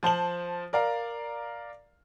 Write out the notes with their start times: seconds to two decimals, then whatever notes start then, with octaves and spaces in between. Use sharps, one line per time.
0.03 F3 C5 A5 F#7
0.73 A#4 D5 F5 A#5